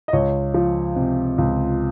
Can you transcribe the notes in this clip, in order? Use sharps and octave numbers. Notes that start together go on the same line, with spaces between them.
D#5
C#2 C#5
F3
C3
C#2